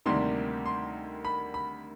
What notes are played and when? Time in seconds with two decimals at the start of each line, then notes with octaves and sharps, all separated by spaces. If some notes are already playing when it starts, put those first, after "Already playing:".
0.06 D2 C3 D#3 G3 A#3 C6
0.65 C6
1.25 B5
1.54 B5